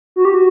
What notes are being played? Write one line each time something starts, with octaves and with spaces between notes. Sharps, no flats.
F#4
G4
F#4